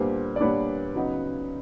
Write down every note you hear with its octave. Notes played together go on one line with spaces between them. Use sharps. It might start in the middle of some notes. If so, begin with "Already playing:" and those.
Already playing: A#2 G3 B3 D4 C5
D5
A#2 G3 B3 D4 B4 C#5
C#3 F#3 B3 D#4